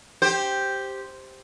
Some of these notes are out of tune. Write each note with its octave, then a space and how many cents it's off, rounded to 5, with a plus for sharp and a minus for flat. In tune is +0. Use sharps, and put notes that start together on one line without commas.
G4 +0 C5 +0